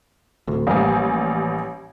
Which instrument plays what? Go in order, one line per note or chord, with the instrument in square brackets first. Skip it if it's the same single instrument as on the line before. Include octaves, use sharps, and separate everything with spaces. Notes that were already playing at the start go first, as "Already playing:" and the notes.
[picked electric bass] D1 D2
[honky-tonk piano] A1 G3 G#5 [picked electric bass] F3 A#3